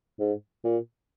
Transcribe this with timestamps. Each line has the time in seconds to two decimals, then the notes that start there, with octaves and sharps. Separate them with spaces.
0.20 G#2
0.64 A#2